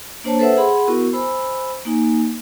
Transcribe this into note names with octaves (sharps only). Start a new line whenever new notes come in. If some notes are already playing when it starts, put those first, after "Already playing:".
A#3 D4 C5 C#5 A5
A4 B4 C5 E5 F#5 E6
G#4 F#5 B5 C6
B3 E4 F#4 A#4 C#6
C5 G#5 B5 E6
A#3 D#4 G#5